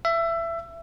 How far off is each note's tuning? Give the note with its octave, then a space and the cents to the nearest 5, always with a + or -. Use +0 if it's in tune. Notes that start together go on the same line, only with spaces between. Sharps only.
E5 +20